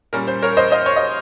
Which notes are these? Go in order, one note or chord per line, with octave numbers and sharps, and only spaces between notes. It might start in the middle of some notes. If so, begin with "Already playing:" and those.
A#2 G3 C#4 A#4
C5
A#4 C#5
C5 D#5
C5 D#5
C#5
D#5